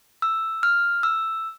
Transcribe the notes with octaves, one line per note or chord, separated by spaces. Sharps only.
E6
F6
E6